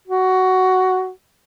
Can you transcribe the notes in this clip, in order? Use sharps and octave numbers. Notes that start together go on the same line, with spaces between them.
F#4